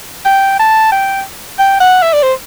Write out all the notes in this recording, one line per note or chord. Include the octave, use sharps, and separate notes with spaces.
G5
A5
G5
G5
F#5
E5
D5
C5